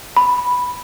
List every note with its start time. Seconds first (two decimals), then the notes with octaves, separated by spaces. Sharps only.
0.17 B5